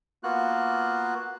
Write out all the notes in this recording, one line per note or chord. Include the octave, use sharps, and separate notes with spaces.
A#3 B3 F4 F#4 F#6